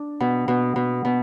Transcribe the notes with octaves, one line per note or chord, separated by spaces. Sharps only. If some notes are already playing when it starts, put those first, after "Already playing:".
Already playing: D4
B2
B2
B2
B2